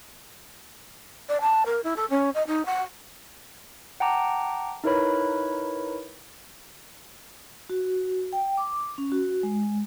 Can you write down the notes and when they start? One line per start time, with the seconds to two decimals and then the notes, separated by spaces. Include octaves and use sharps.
1.29 D5
1.41 A5
1.65 A#4
1.84 E4
1.96 A4
2.10 C#4
2.34 D#5
2.47 D#4
2.65 F#5
4.00 F#5 G5 A5 A#5 D6
4.84 D#4 E4 A#4 B4 C#5 B5
7.70 F#4
8.33 G5
8.57 D6
8.98 C#4
9.12 F#4
9.43 G#3